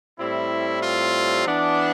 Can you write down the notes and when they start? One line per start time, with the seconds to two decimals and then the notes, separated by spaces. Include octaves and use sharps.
0.18 A2 G3 C4 E4
0.82 F4
1.46 E3 B3 D4